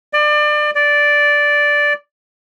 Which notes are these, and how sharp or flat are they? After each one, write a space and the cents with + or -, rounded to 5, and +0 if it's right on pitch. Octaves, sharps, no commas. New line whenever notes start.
D5 +30
D5 -5